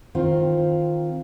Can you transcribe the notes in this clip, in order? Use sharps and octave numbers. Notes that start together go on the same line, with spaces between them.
D#3 C4 F4